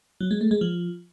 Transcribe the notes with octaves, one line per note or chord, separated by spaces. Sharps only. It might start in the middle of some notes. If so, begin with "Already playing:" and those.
F#3
G#3
A3
G#3
F3